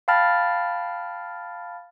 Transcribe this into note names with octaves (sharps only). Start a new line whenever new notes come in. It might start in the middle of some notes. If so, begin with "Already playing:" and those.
F5 G5 A5 B5 F6 A6